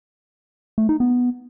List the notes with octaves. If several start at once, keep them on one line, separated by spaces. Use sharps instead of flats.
A3
D#4
B3